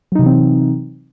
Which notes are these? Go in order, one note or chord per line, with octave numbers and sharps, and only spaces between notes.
C3 E3 F#3 C4 D#4